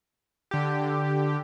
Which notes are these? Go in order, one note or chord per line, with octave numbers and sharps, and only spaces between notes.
D3 G4